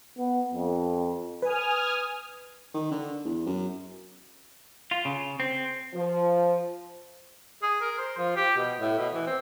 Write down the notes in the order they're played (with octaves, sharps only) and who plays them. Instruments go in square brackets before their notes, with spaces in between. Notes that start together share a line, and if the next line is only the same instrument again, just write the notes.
[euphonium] B3
F2
[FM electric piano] B4 [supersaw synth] G#5 D#6 F6
[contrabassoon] D#3
D3
E2
F#2
[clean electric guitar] F4
C#3
C4
[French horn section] F3
[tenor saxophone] G#4
A#4
C5
F3
G4
B2
A2
B2
E3
C4